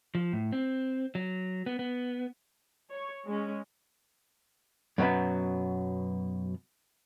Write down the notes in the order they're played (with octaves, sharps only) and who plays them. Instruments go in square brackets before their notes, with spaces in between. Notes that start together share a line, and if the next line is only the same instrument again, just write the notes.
[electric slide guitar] F3
A2
C4
F#3
B3
B3
[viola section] C#5
G#3 C#4
[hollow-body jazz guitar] F#2 B2 D3 F#3 B3